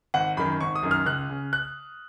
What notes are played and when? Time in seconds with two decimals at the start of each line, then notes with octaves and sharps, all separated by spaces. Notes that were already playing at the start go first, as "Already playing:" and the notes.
0.14 G#1 F#5
0.37 F#2 D#3 B5
0.60 G#1 C#6
0.76 D#6
0.83 F#2 D#3
0.91 F6
1.06 C#2 F#6
1.29 C#3
1.53 F#6